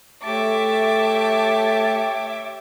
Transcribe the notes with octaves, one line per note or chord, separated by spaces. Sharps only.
A3 G4 C#5 E5 A5 D6